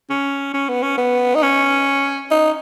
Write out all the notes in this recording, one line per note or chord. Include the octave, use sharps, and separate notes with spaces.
C#4
C#4
B3
C#4
B3
D#4
C#4
D#4